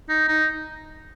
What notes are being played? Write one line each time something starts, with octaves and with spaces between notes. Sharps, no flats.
D#4
D#4